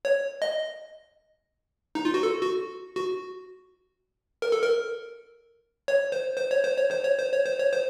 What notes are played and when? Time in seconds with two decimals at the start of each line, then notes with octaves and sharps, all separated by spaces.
0.05 C#5
0.42 D#5
1.95 D#4
2.05 F4
2.14 F#4
2.23 A4
2.42 F#4
2.96 F#4
4.42 A#4
4.52 A4
4.63 A#4
5.88 C#5
6.12 C5
6.37 C5
6.51 C#5
6.64 C5
6.77 C#5
6.91 C5
7.04 C#5
7.18 C5
7.32 C#5
7.46 C5
7.59 C#5
7.73 C5